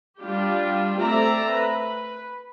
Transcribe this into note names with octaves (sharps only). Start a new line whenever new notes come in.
G3 D4 F4 G4
A3 C4 D5 E5 A#5
B4